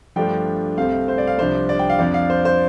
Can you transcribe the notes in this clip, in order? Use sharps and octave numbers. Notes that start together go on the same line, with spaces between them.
G2 F3 A3 D4 G5
C2 C3 A3 C4 F5
C5
D5
F5
C2 C3 F3 D4 C5
D5
G5
F5
F2 F3 D4 D5
F5
C5
C5